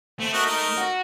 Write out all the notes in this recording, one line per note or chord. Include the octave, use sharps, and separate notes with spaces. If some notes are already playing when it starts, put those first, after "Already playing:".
A3 C4
F#4 A#4 D#5
D#4 A#4
F#4